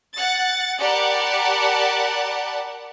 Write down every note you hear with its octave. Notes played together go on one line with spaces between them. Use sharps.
F#5 A6
G4 A#4 D5 F#5 A5 B5